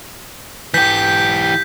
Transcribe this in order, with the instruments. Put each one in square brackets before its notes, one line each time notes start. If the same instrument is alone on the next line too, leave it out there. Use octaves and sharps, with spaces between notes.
[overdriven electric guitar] E3 G4 [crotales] G6 B6